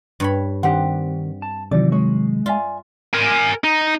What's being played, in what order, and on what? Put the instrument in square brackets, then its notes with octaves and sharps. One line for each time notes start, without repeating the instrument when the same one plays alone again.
[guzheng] G2 C#5 B5
[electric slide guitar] D#3 [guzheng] C4 [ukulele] D4 G4 F#5
[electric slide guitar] A5
[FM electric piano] C3 D#3 F#3 [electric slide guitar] E3 [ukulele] D5
[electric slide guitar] G#3 [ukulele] C#5
[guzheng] F4 [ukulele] D5 E5 G#5
[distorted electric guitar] A#4 G#5
D#4